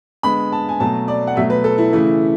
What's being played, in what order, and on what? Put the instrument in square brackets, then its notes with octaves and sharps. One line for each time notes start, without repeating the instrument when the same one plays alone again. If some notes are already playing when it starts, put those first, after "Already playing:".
[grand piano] D3 G#3 B3 B5
A5
G#5
B2 F#3 A3 A5
D5
F#5
B2 F#3 A3 E5
B4
A4
E4
C#3 E3 A3 E4